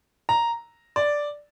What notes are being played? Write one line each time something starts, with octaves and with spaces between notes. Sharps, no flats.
A#5
D5